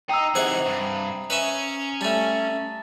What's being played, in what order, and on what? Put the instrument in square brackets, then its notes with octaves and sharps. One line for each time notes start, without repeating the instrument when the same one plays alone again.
[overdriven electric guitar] D#4 [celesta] G5 E6 [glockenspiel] A#5 D#6 C7
[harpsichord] C3 G#4 F#5 [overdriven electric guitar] E3 D#4 [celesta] C5
[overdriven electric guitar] G2
[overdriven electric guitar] C#4 [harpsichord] B4 D#5 E5
[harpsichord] G3 A3 [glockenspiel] A5 A6